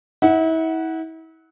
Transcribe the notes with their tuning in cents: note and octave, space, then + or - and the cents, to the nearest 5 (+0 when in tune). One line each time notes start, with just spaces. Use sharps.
E4 -35 F#5 +0